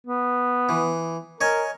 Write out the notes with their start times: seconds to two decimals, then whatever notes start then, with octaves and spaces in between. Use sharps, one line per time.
0.07 B3
0.69 E3
1.41 A#4 C#5 D#5 G#5